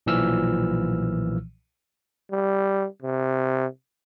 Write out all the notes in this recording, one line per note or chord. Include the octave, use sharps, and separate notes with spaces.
B1 A#2 E3 F3 E6 F6
G3
C3